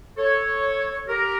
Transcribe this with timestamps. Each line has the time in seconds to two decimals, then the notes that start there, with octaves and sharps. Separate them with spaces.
0.18 A4 C#5
1.08 G4 A#4